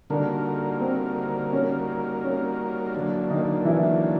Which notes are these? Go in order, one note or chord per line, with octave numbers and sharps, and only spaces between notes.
D3 G3 A#3 D4 D#4 F#4 A#4
C4
C#4
C#4
D3 F#3 A#3 D4
D#3 D#4
E3 E4